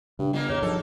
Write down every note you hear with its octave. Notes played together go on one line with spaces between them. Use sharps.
G2 C#3
G1 D#3 A#3
F#2 D3 G#4 C#5
G2 D#3 F3 F#3 A4